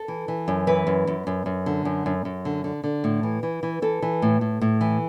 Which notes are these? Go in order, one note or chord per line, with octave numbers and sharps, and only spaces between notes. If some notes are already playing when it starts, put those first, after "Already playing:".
Already playing: A4
E3
E3
F#2
E3 B4
F#2
F#2
F#2
F#2
D3
F#2
F#2
F#2
D3
D3
D3
A2
E3
E3
E3
E3 A4
E3
A2
A2
A2
E3